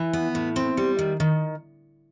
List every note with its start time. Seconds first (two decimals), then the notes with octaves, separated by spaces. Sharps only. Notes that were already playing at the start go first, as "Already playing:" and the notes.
Already playing: E3
0.13 B3
0.35 A2
0.56 C4
0.77 G3
0.99 D#3
1.20 D#3